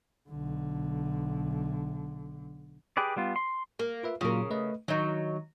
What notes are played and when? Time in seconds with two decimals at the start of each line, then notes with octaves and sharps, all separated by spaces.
0.30 B1 D3
2.97 G4 G#4 B4 D5
3.16 G3 B3 F4
3.36 C6
3.79 A#3
4.03 F4 B4 E5
4.21 A#2 C#3 F#3 F4 A#4
4.51 A3 B4 D#5
4.88 D#3 F#3 D#4